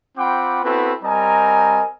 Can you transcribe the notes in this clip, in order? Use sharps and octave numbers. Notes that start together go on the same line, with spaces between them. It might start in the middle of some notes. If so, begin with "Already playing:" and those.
C4 F4 F#5 G5 B5 D6
B3 C4 E4 F#4 A4 B4
G3 C4 A#4 D#5 G#5 A#5